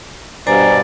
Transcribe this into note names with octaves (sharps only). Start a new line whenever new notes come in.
G2 B2 C5 D5 G#5 A#5